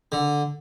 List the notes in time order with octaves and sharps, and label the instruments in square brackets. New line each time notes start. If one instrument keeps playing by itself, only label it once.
[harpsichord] D3